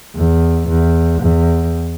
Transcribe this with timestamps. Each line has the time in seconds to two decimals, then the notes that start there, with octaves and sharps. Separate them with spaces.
0.16 E2
0.68 E2
1.22 E2